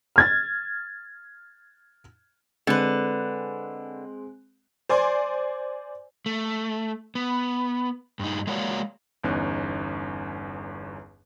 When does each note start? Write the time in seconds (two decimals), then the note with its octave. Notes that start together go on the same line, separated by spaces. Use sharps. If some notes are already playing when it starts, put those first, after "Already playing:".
0.16 F6 G#6 A6
2.67 D3 G#3 C4 B4 F#6
4.89 C5 D5 G#5 C6
6.26 A3
7.15 B3
8.19 G2 D#4
8.47 G#3 A#3 F#4 C#5 D5 F5
9.24 G1 E2 C#4 D#4 F#6